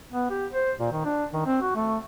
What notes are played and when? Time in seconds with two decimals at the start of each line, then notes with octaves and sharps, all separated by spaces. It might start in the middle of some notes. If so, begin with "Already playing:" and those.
0.12 B3
0.30 G4
0.53 C5
0.79 A#2
0.92 D#3
1.05 D4
1.33 D#3
1.46 C4
1.62 F#4
1.75 A3